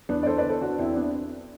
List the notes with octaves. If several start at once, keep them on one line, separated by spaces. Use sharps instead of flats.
E2 B3 D4
D5
E2 A4 C5
B4 D5
D3
A4 C5
D3 D4 F#4
E2 C4 E4
B3 D4